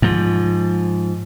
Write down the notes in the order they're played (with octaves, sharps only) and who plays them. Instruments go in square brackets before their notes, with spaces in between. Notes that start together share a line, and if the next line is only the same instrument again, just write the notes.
[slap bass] G#2 F3